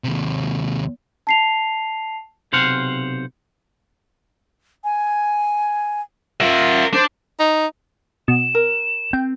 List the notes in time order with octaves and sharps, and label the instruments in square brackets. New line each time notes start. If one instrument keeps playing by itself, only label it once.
[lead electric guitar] D#2 C3
[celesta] A5 C7 F7
[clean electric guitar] B1 C3 C5 F5 F#5
[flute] G#5
[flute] F4 [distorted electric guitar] A#4 E5
[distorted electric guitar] D4 [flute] C5
[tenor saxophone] D#4
[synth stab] B2 [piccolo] E7
[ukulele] A#4
[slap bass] C4 [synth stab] G5